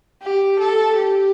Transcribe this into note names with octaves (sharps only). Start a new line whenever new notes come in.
G4
A4
G4